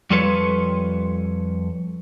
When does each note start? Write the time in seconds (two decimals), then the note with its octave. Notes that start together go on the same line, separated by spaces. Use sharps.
0.10 F2 G3 F4 A4 B4 C#5